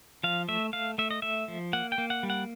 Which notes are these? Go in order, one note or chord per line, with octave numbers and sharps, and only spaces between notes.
F3 F5
A3 E5
A3 F5
A3 E5
D#5
A3 E5
F3
A#3 F#5
G5
A#3
F#5
G3
F#5